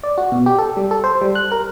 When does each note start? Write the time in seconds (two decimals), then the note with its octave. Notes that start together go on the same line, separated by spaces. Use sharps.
0.03 D5
0.18 F#4
0.32 B2
0.46 G4
0.59 A4
0.77 G3
0.91 A4
1.04 C5
1.21 G3
1.35 F#6
1.52 A#4